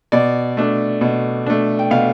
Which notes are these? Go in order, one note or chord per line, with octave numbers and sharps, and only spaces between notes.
B2 D5
A3 D4
B2
A3 D4
G5
B2 F5